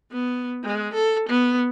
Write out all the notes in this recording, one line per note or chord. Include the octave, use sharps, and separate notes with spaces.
B3
G#3
A4
B3